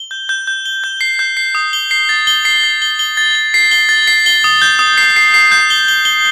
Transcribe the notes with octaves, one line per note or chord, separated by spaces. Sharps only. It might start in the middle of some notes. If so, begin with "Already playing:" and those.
Already playing: G7
G6
G6
G6
G7
G6
C7
G6
C7
D#6
G7
C7
A6
G7
C7
A6
G7
G7
A6
G7
C7
G7
A6
C7
G7
D#6
G6
D#6
C7
C7
C7
G6
G7
G7
G7